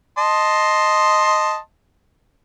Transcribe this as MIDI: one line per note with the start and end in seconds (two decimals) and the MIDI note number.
0.18 1.57 75
0.18 1.57 81
0.18 1.57 84